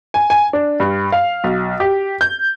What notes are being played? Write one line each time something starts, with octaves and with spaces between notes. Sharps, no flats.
G#5
G#5
D4
G2
F5
B1
G4
G6